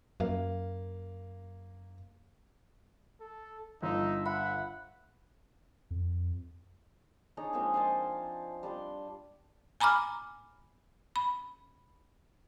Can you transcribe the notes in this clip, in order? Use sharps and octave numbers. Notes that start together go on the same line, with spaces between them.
F#2 A#3 F5
A4
G1 D#4 E5
E5 F#5 B5
F2
D4 D#4 G#4 C#5
F3 G#3 A#3 C4
C5 F5 G#5 A5
G3 D4 B4 C6
G#5 A#5 B5 D6 F6
B5